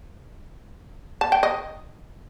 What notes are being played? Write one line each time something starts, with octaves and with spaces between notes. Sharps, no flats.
A5
G5
D#5